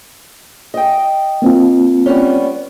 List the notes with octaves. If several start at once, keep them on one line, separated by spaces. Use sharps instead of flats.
D#5 G5
A#3 C4 F4
G3 B3 C#4